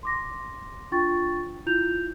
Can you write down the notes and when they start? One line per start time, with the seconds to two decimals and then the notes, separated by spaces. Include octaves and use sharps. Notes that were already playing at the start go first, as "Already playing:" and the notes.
0.03 C6 D6 A#6
0.92 D4 F4 G5 C#6 A6
1.67 E4 F4 G6 F7